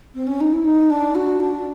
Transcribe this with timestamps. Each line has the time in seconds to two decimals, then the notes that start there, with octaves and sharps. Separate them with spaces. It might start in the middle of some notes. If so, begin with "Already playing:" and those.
0.14 C4
0.27 C#4
0.40 D#4
0.52 E4
0.65 D#4
0.90 D4
1.15 F#4
1.40 D4